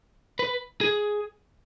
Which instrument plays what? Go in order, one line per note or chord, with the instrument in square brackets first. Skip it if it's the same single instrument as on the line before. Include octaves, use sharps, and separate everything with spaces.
[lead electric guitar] B4
G#4